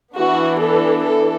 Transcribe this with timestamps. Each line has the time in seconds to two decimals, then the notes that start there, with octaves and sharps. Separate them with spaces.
0.15 E3 B3 D4 F#4
0.59 A4
1.01 A4